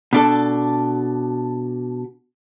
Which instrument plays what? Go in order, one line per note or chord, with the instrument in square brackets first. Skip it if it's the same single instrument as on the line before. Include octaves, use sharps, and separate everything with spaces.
[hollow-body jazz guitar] B2 D4 A4